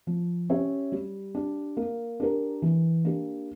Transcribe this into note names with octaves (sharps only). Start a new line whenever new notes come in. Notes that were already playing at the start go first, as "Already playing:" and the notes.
F3
C#4 G4 C#5 E5
G3
D4 G4
A#3
D4 G4 A#4
E3
A#3 D4 G4